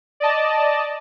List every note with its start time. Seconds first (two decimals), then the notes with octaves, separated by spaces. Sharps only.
0.20 D5 D#5 A5